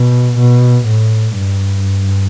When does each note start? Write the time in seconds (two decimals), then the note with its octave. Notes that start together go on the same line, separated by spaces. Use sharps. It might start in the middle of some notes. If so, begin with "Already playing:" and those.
Already playing: B2
0.39 B2
0.86 A2
1.35 G2